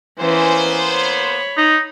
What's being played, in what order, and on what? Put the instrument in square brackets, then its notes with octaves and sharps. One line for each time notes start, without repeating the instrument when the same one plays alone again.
[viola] E3 C#4 [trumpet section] A#3 B3 C5
[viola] C#5 B5
[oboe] D#4